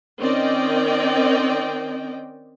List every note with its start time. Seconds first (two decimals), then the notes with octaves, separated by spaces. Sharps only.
0.20 D#3 C4 C#4 D5 D#5 G5